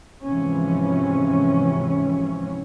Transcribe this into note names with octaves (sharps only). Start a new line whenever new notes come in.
G#2 C3 E3 F3 C#4